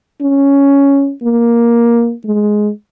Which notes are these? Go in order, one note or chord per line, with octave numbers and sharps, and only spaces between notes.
C#4
A#3
G#3